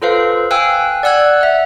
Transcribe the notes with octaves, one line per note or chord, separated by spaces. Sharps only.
F4 A4 B4 C5 F5
F5 G5 G#5 E6 F#6
D5 F#5 E6 F#6 G#6
E5 F#5